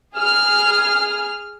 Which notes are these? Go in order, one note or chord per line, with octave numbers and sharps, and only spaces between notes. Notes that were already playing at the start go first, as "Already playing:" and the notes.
G#4 F6